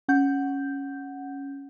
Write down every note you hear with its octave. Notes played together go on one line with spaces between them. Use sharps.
C#4 F#5 G6